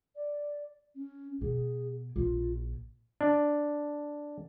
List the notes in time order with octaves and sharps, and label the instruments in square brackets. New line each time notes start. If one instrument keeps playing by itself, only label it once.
[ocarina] D5
C#4
[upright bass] B2 [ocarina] G#4
[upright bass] A#1 [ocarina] F4
[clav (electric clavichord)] D4